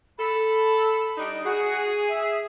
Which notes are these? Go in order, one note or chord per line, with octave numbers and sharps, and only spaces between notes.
A4 B5
G3 D4 D#4
F#4 G#4
E5